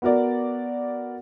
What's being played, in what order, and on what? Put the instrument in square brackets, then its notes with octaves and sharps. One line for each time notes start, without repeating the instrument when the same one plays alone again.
[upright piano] B3 F#4 A#4 D5